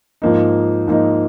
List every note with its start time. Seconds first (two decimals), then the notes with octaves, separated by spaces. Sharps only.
0.22 G#2 F3 A#3 D#4
0.88 G#2 F3 A#3 D#4